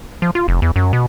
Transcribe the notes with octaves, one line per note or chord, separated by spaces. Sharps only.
F3
F4
F1
E2
F#2
B2